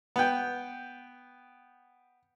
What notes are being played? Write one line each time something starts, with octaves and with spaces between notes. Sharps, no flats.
B3 G5